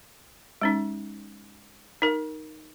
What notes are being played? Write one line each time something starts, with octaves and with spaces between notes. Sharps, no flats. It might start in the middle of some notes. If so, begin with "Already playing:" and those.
G#3 C#4 D#4
D#4 A#4